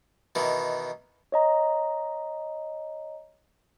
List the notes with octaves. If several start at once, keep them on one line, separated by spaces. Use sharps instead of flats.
B2 D#3 E3
C#5 D#5 A#5